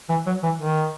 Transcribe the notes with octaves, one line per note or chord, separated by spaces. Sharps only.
E3
F#3
E3
D#3